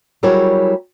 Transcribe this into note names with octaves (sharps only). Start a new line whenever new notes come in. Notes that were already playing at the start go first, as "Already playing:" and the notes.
F#3 G3 E4 G#4 A#4 C#5